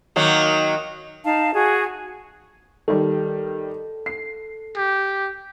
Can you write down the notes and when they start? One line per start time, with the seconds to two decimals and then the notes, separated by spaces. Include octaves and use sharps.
0.16 D#3 F#3 A#3
1.24 D#4 F5 A5
1.53 F#4 G#4 G#5
2.88 D#3 G3 A4
4.06 C7
4.76 G4